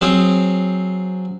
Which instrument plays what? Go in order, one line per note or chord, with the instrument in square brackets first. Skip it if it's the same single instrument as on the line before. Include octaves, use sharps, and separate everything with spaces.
[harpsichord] F#3 C4 F4 G#4 C5